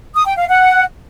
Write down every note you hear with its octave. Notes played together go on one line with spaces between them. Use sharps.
D#6
G5
F5
F#5